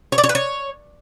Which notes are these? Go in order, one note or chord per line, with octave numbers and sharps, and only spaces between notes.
C#5
D5
C#5
B4
C#5